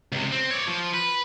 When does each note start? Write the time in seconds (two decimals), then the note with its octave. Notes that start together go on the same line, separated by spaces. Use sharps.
0.12 C#2 C3
0.32 C4
0.50 C#5 D5
0.67 F3
0.93 B4